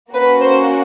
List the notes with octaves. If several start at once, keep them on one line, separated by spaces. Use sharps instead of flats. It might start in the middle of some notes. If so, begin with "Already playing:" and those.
A#3 C#4 F#4 B4
C5